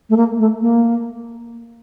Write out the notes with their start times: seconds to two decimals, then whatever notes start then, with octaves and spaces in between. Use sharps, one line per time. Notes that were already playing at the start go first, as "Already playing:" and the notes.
0.10 A3
0.17 A#3
0.39 A3
0.61 A#3